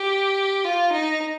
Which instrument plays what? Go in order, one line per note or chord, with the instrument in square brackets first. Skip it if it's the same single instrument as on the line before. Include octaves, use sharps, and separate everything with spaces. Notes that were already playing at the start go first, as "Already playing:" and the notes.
Already playing: [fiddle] G4
F4
D#4